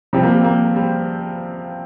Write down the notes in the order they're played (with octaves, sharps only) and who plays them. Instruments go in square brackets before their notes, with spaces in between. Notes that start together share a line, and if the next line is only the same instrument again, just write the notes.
[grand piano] C3 F3 C4 [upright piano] G3
[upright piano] A#3
G3
A#3
G3